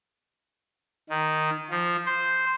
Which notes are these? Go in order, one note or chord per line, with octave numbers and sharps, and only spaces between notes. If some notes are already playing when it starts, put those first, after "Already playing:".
D#3
F3
C5